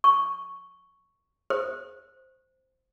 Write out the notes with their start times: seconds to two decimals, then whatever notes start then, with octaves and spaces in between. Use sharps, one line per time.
0.04 C#6
1.50 C5